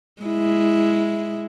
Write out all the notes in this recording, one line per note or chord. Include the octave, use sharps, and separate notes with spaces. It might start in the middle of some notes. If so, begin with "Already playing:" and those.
G#3 E4